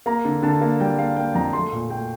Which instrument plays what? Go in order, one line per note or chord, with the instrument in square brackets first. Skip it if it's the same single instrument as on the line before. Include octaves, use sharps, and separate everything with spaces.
[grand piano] A#3 A#5
D3
D3 A5
A#3
G3 G5
A#3 F5
A#3 G5
F2 A#5
A3 C6
A#2
A3 G5